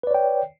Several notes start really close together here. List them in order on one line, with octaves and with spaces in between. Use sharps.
B4 D5 C#5 G5